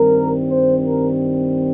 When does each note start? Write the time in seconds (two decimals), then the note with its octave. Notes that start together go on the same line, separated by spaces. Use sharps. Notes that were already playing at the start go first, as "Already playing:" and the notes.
Already playing: G2 D#3 G3 C4 A#4
0.50 C5
0.84 A#4